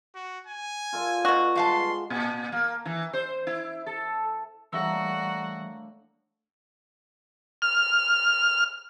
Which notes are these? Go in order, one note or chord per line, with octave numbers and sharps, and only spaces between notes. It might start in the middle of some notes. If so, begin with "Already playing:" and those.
F#4
G#5
F4 A4 D5
B2 F#4
G2 G#3 F5 A5 C6
A#2
A#3
E3
C5
E4
A4
A2 D3 E3 G3 A#3 F#4 E5 E6
F6